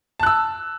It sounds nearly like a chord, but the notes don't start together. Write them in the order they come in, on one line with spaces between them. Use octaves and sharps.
A5 F#6 E6